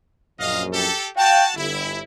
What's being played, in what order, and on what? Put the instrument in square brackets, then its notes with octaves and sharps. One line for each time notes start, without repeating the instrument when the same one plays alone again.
[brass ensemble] A#1 F#2 [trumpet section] D#5 F5
[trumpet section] G4 A4
[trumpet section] F#4 A5 [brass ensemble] F5 G5
[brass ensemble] G1 [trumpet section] E4